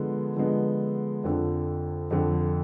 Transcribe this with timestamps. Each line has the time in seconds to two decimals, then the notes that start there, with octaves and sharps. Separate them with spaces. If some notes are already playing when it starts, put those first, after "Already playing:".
Already playing: D3 F3 G#3 B3
0.36 D3 F3 G#3 B3
1.24 F2 D3 F3
2.11 F2 D3 F3